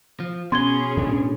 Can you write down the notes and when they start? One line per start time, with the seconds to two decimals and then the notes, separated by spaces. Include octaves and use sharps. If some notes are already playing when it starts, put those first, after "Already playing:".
0.20 F3
0.52 B2 B3 C#4 G#4 C6 G#6 G7
0.97 A2 G#3 D4